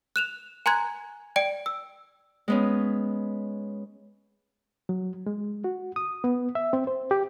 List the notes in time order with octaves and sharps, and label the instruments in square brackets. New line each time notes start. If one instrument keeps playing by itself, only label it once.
[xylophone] F#6 E7 F7
G#5 A#5 C6 F#6 G#6
D5 G5 D7
E6
[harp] G#3 B3 C#4
[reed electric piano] F#3
G#3
F#4
D#6
B3
E5
C4
C5
G4